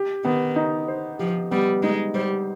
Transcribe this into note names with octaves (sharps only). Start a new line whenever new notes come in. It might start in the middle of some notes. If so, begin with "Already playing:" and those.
Already playing: G4
D#3 B3
D#4
C5
F3 G4
G3 B3
G#3 D#4
G3 C5